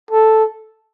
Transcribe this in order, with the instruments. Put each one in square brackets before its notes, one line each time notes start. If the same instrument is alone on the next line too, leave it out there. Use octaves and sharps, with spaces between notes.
[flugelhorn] A4